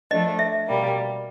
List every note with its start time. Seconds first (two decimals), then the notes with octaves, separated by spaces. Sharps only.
0.11 F3 A3 D4 D#5
0.39 E5
0.67 B2 G3 A#3